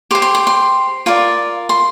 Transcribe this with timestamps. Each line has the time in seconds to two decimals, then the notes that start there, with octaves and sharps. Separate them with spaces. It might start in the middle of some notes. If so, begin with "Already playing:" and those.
0.11 G4 C6
0.15 C5
0.22 C6
0.35 C6
0.47 C6
1.06 F4 A#4 D5
1.69 C6